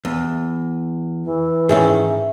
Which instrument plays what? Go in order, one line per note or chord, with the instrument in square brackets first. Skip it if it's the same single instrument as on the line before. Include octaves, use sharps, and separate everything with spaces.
[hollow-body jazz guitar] E2
[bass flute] E3
[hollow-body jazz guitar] G#2 D#3 C#4 [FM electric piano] G#4 E5